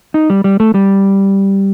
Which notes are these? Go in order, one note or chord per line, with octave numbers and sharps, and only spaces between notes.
D#4
G3
G3
A3
G3